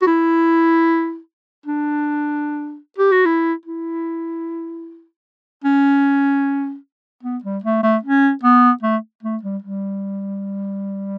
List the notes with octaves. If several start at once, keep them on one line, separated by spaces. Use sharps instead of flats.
F#4
E4
D4
G4
F#4
E4
E4
C#4
B3
G3
A3
A3
C#4
B3
A3
A3
G3
G3